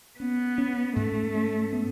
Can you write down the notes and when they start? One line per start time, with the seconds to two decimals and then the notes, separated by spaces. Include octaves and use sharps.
0.19 B3 C#4
0.58 C#4
0.96 G#2 A3
1.35 C#4
1.73 B3